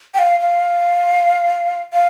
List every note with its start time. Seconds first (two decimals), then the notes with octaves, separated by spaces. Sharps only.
0.14 G5
0.19 F5
0.40 F5
1.93 F5